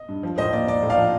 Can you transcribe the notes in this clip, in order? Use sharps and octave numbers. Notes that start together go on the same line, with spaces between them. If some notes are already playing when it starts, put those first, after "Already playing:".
Already playing: D#5
G2
F3
A2 C5 D#5
A#3 D5
A#3 D5
A2
D5 F5
F3